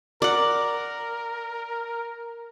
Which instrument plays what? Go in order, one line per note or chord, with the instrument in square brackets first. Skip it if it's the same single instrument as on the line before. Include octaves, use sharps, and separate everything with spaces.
[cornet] A#4 [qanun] D5 F#5